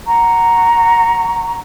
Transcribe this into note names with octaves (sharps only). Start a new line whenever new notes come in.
F#5 A#5 C#6